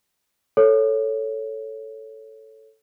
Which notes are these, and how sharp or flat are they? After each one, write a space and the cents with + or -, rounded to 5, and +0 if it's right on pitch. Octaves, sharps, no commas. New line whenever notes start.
A4 +0 C#5 +0